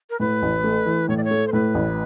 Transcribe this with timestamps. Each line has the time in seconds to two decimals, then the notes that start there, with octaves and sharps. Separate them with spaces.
0.10 A#4
0.20 A2 B4
0.42 A1
0.64 A3
0.86 E3
1.09 A2 C#5
1.17 D5
1.24 C#5
1.31 A3
1.48 C5
1.53 A2 B4
1.75 A1